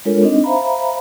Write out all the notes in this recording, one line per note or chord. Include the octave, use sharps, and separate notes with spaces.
G#3 D4 F4 A4 A#4 C#5
C4 D4 D#4 D#5
C5 E5 F5 A#5 B5